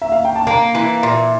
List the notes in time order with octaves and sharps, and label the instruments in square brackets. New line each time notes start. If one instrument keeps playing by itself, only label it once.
[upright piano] E5
F5
G5
A5
[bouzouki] A#3 [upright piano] A#5
[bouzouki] E3
A#2